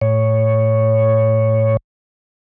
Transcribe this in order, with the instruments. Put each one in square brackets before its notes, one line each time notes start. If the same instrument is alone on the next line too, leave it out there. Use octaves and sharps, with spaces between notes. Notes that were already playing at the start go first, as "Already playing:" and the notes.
[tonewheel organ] A2 C#5